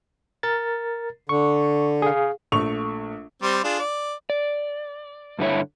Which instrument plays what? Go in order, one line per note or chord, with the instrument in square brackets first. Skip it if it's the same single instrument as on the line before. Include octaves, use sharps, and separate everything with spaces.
[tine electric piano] A#4 A6
[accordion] D3 [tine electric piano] C#6
[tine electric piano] G#4 F5
[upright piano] A#1 A3 C#6 F7
[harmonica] G3 C4 C6
D4 F4 G#4
D5
[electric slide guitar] D5
G2 D3 E4 C#5